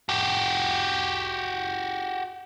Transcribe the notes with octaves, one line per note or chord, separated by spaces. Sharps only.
F#4 G4